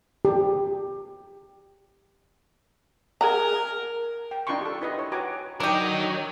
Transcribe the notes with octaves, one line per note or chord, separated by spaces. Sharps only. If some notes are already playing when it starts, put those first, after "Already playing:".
G4
G#4 A#4 F#5 A#5
G5
D4 D#4 F4 G5 C6 C#6
G4 A4
E4 B4 D#5
C#5
F#4 B4 G5 G#5 A#5 D6
F#3 D4 D#4 G4 A#4 D#5